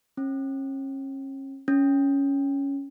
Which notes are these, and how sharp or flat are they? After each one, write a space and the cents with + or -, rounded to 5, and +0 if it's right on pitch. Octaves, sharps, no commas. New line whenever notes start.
C#4 -40
C#4 +5